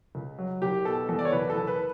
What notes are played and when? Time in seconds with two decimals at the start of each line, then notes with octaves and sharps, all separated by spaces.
0.15 C#2
0.38 F#3
0.62 F#1 G4
0.85 B2 A4
1.09 E2 A4
1.19 D5
1.25 C#5
1.32 F#1 B4
1.50 A4
1.55 F#1
1.67 B4